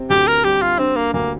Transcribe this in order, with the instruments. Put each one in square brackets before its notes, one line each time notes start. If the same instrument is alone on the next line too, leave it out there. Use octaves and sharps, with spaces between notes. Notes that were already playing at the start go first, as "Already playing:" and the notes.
Already playing: [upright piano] C3 C4
[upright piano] D2 [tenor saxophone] G4
[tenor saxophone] A#4
[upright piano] G3 [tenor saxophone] G4
[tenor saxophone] F4
[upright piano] D3 [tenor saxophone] C4
[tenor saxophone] A#3
[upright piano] D2 [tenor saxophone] A#3